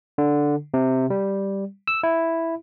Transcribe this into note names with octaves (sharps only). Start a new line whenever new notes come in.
D3
C3
G3
E6
E4